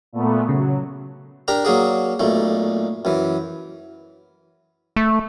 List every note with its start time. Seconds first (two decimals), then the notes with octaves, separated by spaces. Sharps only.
0.13 A#2 A3 B3
0.49 C#3 F#3
1.48 D4 G4 A#4 A#5
1.65 F#3 A#3 G#4 D5
2.20 B1 A#2 A3
3.05 F#2 E3
4.96 A3